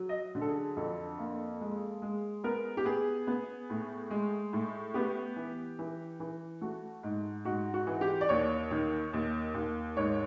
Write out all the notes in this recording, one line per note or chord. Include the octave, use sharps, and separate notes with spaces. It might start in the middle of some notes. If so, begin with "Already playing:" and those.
Already playing: F#3
D#5
D3
A4
G#4
F2 A4
A#3
G#3
G#3
B3 A#4
G4
B3 G#4
B3
A2
G#3
A2
B3 G4
E3
E3
E3
A3 F#4
G#2
G#2 F#4
F#4
E3
G4
D5
D#2 C#5
D#3
D#2
D#2
G#2 C#5